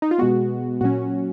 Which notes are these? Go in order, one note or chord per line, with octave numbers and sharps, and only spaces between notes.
D#4
F4
B2 G#3 B3 F#4
A#2 F#3 C#4 F#4